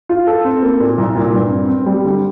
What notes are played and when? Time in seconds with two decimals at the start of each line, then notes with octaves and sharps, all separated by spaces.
0.09 F4
0.27 A4
0.45 C4
0.62 A#3
0.80 A#2
0.98 C2
1.15 A#2
1.34 G2
1.51 C4
1.69 C4
1.86 G3
2.04 D3